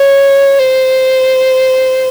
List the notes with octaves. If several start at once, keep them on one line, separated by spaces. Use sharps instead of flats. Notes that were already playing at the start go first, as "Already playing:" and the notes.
Already playing: C#5
C5